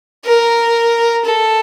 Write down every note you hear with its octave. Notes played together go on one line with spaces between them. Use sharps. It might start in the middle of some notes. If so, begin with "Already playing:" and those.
A#4
A4